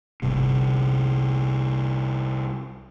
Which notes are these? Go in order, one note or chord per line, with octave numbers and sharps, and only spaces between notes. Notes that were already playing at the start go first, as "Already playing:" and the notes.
G1 C2 G2 C3